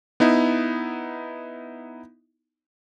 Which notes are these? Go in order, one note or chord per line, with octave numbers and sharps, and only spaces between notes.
B3 D#4 E4